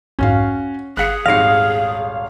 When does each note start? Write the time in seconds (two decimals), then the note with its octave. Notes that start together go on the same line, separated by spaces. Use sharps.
0.19 B1 F2 G#2 C#4 F#4 F5
0.97 G1 G#4 F5 F#6 B6 C#7
1.26 D#1 G#1 F5 A#6 C7 C#7